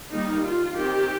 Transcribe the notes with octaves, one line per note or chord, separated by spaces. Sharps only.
D#3 G3 A#3 D#4
F4
D#3 C4 G4